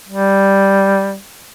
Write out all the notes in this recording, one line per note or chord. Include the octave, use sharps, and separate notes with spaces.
G3